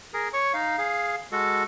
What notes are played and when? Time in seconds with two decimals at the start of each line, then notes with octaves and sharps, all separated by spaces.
0.14 G#4 A#4
0.33 C#5 C#6
0.54 D#4 F5
0.78 G#4 F5
1.32 G#3 F#4 A4